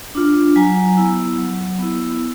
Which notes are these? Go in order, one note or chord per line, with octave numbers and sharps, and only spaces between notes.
D4 F4
F#3 G#5 A#5
B3 E4
F#3
B3 E4